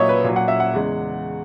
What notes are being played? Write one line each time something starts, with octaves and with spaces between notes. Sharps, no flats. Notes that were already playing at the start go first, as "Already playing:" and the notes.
Already playing: A#2 F#3 C#5 D#5 E5
B4
A#2 F#3
F#5
E5
F#5
E2 C#3 G#3